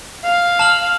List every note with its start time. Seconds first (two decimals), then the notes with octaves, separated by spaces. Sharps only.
0.24 F5
0.59 A5 F6 F#7